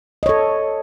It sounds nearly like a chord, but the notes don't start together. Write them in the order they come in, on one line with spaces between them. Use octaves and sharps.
D#5 C#5 A4